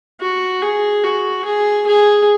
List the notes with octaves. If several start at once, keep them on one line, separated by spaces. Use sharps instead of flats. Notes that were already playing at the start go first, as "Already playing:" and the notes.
F#4
G#4
F#4
G#4
G#4